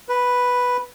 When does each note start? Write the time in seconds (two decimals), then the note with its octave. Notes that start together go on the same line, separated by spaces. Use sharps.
0.09 B4